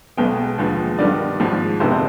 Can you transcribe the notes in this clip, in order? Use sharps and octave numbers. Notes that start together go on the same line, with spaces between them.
B1 B2 G#3 B3 G5
D#2 D3 F3 G#3 B3
G2 D#3 G3 B3 D5
G#1 G#2 F3
G1 F2 C3 D#3 B3 C5